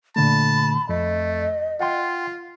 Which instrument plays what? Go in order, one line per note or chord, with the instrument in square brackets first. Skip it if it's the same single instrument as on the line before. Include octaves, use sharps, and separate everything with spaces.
[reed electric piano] A#2 D3 A3 [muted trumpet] A5 [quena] B5
[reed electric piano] F2 [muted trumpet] A3 [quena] D#5
[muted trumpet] F4 [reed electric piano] F#5 G5 C6